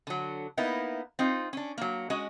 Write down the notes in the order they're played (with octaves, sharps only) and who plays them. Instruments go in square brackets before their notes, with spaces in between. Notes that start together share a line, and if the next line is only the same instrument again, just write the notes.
[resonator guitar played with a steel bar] D3 F#3
A#3 B3 D#4 E4
C4 D#4 F4
C#4 D4
F#3 A#3
G#3 C#4 F#4 D#5